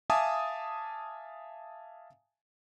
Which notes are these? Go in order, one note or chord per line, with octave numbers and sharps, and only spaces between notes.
E5 F5 G#5 A5 D6 D#6